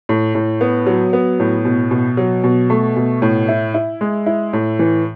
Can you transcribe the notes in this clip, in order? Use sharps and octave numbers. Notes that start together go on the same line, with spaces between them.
A2
A2
B3
F#3
B3
A2
B2
B2
F#3
B2
A3
B2
A2
E4
E4
G#3
E4
A2
E3